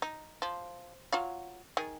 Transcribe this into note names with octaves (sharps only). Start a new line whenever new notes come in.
D#4
F3
F#3 F4 F5
D#3 G#4